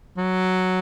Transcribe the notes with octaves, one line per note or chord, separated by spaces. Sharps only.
F#3